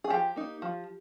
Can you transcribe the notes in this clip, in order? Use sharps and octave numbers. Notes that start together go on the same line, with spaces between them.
G#4
F3 G4
A#3 D#4
F3